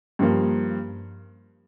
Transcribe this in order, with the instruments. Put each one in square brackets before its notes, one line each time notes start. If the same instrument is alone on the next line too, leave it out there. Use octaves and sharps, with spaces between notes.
[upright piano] G2 F3 A#3